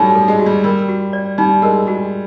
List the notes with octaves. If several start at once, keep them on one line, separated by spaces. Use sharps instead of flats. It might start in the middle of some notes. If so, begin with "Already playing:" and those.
Already playing: F#3 G3 A3 D#4
A4
G#3
F#4
G3
G3 A#4
F#4
D5
G3 D#4
G#3 A#4
G#3 F#4